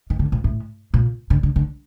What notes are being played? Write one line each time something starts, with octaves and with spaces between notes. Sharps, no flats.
D#3
D3
A#2
A2
A#2
D3
D3
D3